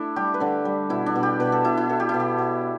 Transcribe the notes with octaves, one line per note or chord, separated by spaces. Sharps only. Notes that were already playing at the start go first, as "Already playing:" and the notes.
Already playing: A3 D4 E4
G3 G4
B4
D3 A4
G3
B2 E4
D4
B2
G4
B2 B4
A4
B2 E4
E4
B2 A4
G4
E4
B2
G4
B2